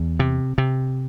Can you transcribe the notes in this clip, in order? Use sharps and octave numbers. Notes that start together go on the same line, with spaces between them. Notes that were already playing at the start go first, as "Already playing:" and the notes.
Already playing: E2
C3
C3